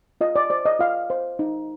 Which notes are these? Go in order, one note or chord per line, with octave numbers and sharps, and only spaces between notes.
F4 D#5
D5
C5 D5
D#5
F4 F5
C5
D#4